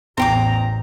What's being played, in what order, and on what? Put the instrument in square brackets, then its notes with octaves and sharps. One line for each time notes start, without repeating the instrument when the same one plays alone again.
[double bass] A1 [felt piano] E2 [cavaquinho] C5 G5 D6 [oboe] A#5